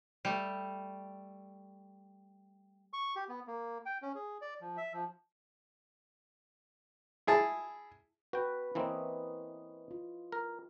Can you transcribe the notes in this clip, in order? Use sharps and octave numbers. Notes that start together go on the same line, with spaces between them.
G3 A3
C#6
G4
B3
A#3
G5
C#4
G#4
D5
F3
E5
F3
E4 G#4 A5
F#4 B4 G5
E3 A#3 C4 E4 C#5 D#5
F4
A#4